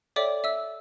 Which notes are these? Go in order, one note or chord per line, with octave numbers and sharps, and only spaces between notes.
A4 C#5 D5 E5 G5 D6
E5 E6